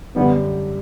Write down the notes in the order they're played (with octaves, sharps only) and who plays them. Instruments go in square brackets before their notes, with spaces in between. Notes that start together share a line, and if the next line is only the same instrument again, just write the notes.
[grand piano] F#2 D3 G3 D4 [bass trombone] B3